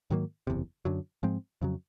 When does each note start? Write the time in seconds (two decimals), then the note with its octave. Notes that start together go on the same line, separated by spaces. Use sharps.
0.10 G#2 D#3 F#3 A#3
0.47 F#1 E2 C3
0.85 F#2 D3 F#3
1.23 G#2 F3 G#3 C4
1.62 F2 C#3 F#3